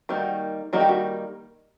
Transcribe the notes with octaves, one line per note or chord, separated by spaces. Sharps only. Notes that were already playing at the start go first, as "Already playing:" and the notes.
D#3 G3 A#3 D#4 F#4
D#3 G3 A#3 D#4 F#4
G4
F#4